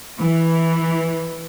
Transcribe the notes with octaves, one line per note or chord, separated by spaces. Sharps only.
E3